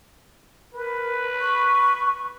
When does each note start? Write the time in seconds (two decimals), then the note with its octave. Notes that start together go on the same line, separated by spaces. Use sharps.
0.74 A#4 B4
1.41 C#6